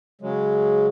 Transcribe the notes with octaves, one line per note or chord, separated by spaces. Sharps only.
C#3 F#3 G#3